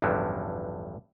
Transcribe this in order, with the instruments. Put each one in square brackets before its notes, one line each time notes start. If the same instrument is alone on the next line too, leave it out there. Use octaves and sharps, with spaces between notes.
[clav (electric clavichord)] A1 E2 G2 D3 F3 F#3